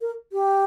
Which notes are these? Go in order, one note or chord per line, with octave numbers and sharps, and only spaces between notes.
A#4
G4